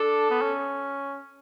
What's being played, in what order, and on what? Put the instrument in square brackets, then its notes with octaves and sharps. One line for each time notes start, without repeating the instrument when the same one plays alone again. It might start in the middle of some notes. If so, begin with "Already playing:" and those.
Already playing: [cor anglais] D4 [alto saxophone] A4
[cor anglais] B3
C#4